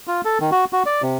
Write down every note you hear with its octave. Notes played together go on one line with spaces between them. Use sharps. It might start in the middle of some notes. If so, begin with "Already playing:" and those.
F4
A4
D#3
F#4
F#4
D5
C3